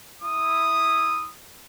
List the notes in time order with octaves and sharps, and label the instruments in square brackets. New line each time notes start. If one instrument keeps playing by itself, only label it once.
[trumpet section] E4 D#6